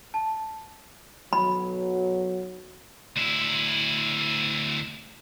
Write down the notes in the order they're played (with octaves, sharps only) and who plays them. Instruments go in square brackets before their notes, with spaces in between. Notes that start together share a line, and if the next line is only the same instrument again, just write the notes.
[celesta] A5
[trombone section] B1 F#3 [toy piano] B5
[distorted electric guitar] D2 E4